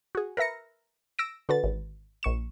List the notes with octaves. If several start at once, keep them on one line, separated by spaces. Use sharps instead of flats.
F#4 G#4
A#4 B4 E5 A#6 C#7
E6 A#6 D7
D3 F#4 B4 A6
G#1
A#1 C#6 E7